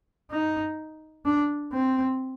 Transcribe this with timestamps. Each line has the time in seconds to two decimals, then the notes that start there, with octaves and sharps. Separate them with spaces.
0.31 D#4
1.25 D4
1.73 C4